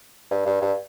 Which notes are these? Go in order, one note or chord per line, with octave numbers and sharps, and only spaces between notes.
G2
G2
G2